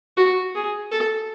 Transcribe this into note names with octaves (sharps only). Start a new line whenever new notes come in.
F#4
G#4
A4